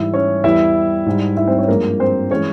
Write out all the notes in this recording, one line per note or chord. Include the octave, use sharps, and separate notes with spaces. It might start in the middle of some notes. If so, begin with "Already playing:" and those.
Already playing: G#2 E3 G3 E4 E5
C#4 C#5
E2 E3 G3 E4 E5
G#2 G3
E4 E5
C4 C5
C#4 C#5
G2 F3 G#3 A#3 A#4
C4 C5
E3 G#3 C#4 C#5